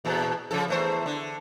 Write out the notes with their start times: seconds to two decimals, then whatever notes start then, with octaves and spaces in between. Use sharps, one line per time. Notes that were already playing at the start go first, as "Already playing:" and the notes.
0.05 E2 A#2 A4
0.51 C#3 F3 A4
0.68 E2 A3 C5
1.06 D3